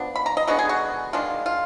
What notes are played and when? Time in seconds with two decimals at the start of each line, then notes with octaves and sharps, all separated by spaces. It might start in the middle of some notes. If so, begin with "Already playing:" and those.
Already playing: F3 B3 D4
0.16 B5
0.26 A#5
0.37 D#5
0.47 D3 G#3 B3 D4 F#4
0.59 G#4
0.69 F#4
1.13 D#3 G#3 D4 F4
1.46 F4